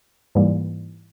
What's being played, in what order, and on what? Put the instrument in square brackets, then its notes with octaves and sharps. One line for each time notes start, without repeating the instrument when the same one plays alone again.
[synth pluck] G#2 E3 G3 A#3